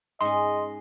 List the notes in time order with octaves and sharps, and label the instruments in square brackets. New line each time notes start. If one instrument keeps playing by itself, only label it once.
[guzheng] G#2 C#4 [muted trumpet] D#5 [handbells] C6